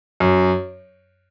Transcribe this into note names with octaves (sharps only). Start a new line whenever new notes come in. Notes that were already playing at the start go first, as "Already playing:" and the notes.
F#2